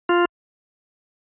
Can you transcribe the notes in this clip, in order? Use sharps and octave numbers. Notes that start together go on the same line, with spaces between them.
F4